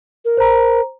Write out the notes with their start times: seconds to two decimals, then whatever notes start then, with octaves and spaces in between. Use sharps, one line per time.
0.25 A#4
0.37 C5 A#5